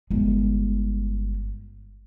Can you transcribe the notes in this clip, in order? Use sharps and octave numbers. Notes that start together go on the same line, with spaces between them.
G1 G#3